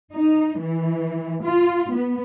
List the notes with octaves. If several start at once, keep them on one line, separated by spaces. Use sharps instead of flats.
D#4
E3
F4
B3